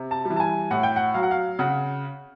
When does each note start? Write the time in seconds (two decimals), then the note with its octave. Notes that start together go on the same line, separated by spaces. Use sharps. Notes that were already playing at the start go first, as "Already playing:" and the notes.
Already playing: C3
0.11 A5
0.25 E3 G3
0.36 A5
0.40 G#5
0.71 A2 F#5
0.83 G5
0.96 F#5
1.14 F#3 F5
1.23 F#5
1.31 F5
1.59 C#3 F#5